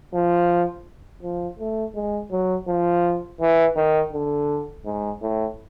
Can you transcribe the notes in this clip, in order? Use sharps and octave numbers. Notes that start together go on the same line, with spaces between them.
F3
F3
A3
G#3
F#3
F3
E3
D#3
D3
G#2
A2